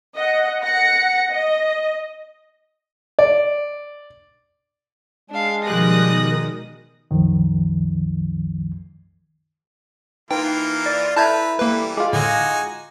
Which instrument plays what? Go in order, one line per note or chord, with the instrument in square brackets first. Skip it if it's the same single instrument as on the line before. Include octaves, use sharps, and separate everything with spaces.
[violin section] D#5 F#5
F#5 A#6 C#7
D#5
[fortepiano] D5
[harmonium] G#3 [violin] D4 F5
[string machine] B2 D#3 A#4 [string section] F3 G3 F#6 [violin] D#6 A#6
[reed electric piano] C2 F#2 D#3 F3
[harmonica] E3 A#3 F4 [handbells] D#4 B4 [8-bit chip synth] G5
[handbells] D5
[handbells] E4 E5 A#5 [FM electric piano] A4 [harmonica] B4 [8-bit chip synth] A5 G6 G#6
[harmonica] E3 G3 [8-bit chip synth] A#3 B4
[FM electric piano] G#3 F4 [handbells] D6
[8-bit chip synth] A2 D3 [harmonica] D#4 F#4 G#5